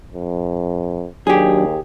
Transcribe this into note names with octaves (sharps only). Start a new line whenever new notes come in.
F2
D#2 F#3 D4 G4 G#4